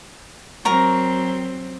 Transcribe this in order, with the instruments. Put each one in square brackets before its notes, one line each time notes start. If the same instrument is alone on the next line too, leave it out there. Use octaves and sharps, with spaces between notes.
[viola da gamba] F#3 C4 [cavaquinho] A#4 A#5 C#6